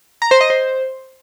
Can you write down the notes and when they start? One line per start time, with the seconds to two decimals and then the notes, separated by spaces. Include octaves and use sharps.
0.22 A#5
0.31 C5
0.41 D#5
0.50 C5